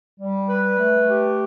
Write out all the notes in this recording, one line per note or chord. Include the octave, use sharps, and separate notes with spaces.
G3
B4
A3
G4